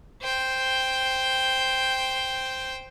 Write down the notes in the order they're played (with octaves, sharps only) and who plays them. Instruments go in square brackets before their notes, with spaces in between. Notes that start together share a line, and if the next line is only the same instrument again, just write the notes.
[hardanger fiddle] C5 G5